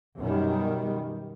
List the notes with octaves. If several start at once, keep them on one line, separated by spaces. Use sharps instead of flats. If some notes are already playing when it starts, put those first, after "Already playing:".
F#2 B2 D#3 G3